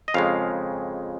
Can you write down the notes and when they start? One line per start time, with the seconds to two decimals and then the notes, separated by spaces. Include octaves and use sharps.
0.08 D#5
0.14 F2 C#3 G#3 F5